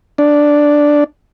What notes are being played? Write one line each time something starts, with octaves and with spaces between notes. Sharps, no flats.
D4